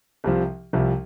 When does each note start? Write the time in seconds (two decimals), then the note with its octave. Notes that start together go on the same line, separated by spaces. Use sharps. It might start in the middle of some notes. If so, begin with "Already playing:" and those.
0.24 C2 C3 F3
0.73 C2 C3 F3